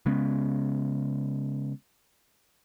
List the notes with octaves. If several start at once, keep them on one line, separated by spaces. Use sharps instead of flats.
C#3 G#3 B3 C#4